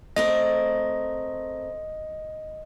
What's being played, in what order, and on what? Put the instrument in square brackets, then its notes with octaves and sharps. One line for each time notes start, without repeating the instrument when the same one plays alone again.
[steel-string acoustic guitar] A3 C4 A#4 [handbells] D#5